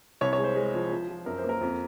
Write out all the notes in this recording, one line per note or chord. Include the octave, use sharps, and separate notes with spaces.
C2 C#5
C#5
G#3
C5
G#3
F3
F3
F3
F#2 A#4
A#3 C5
A#4
F2